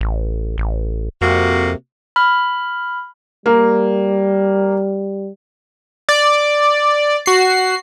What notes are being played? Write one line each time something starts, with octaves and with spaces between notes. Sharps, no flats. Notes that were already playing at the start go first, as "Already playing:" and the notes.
A1
A1
F2 C3 A#3 F#4
B5 F6
G3 A#3
D5
F#4 C7